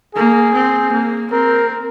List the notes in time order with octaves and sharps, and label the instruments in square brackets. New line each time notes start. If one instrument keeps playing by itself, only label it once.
[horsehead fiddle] A#3 [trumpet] G#4
[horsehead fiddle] C4
A#3
[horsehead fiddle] C4 [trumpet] A#4